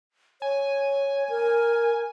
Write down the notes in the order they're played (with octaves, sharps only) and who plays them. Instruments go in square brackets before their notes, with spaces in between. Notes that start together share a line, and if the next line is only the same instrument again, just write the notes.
[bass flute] C#5 [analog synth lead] G#5
[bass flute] A#4